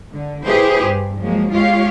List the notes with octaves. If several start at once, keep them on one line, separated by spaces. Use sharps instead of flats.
D3
E4 G4 G#4 B4 C5
G2
F3 F#3 G#3 A#3
G#3 F4 G4 C#5 F5